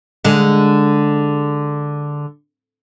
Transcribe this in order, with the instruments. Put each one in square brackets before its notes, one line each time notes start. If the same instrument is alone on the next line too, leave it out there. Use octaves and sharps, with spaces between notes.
[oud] D3 G#3